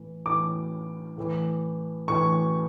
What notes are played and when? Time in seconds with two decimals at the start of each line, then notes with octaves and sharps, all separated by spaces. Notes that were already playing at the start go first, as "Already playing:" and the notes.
Already playing: A2 E3
0.26 A2 E3 D6
1.18 A2 E3
2.08 A2 E3 C#6